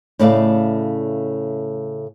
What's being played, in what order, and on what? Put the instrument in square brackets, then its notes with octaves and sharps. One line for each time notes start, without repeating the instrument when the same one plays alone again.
[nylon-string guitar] A2 C#3 A3 D5 E5 F5